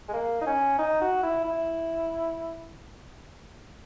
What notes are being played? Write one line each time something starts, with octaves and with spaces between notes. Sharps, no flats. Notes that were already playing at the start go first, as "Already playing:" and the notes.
G#3
A#3
D#4
C#4
D#4
F#4
E4
E4